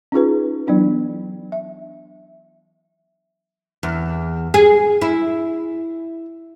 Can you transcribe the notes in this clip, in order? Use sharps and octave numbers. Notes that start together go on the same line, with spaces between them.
C#4 D#4 F4 G#4 B4
E3 F#3 B3 D4 E4
E5
E2
G#4
E4